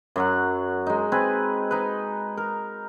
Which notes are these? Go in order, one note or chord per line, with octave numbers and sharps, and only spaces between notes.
F#2 F#3 F#5
G#3 D#4
C4 B4 G#5
D#4 B4
A#4